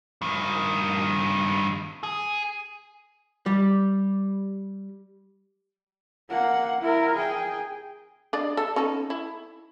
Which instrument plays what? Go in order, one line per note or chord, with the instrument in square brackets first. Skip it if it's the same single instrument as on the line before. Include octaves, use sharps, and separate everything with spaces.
[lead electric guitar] G2 D#3
G#4
[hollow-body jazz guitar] G3
[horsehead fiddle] A#3 F#5
E4 A#4
G#4 G5
[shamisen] D4 D5 D#5
A4
C#4 D#4 A4
E4